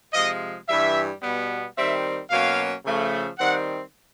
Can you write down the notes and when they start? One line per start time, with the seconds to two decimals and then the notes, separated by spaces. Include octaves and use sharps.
0.13 C3 F3 G#3 D#5
0.68 G2 E3 G3 E5
1.21 B2 G3 B3
1.76 D#3 G3 C4 E5
2.30 B2 F#3 A#3 C#4 F5
2.85 C#3 F3 A3
3.38 D#3 G3 C4 F#5